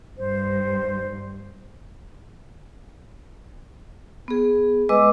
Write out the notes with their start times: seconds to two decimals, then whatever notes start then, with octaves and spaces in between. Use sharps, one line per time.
0.18 G2 C5
4.28 B3 G#4
4.89 G#3 B4 D#5 D6 E6